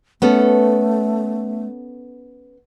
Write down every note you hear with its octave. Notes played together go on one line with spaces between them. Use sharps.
A3 B3 C#4 A4